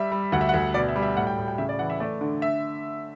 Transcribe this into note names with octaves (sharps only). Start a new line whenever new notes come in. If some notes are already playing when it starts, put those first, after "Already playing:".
Already playing: G3 E5
G3
D2 F#5
E5
F#5
D2
B2 D5
E5
G3
E5
A2 F#5
G5
A2
G5
C#3 E5
D5
E3 F#5
E5
A3 D5
D3
E5